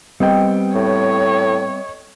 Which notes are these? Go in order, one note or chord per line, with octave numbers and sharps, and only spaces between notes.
G3 B3 C4 D#5 G5
A2 C#5